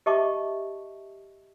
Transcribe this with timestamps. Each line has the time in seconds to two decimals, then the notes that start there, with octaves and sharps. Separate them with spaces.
0.06 G4 D#5 E5 A5 C#6 D6